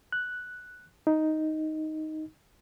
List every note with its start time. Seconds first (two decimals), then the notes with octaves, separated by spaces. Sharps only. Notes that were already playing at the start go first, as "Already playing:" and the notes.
0.12 F#6
1.07 D#4